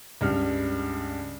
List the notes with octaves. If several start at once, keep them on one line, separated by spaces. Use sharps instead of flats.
C#2 G2 F6